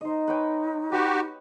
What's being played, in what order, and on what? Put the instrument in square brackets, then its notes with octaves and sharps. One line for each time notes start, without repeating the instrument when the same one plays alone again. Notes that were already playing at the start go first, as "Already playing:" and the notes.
[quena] D#4 [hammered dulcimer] C5 D#5
[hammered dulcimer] B4 C#5 G5
[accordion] F#4 G4 [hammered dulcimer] B4